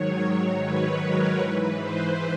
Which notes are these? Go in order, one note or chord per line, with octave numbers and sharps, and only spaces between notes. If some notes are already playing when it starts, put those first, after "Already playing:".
Already playing: G#2 D#3 F#3 C#5
B4
A#4
G#2 E3 B4
C5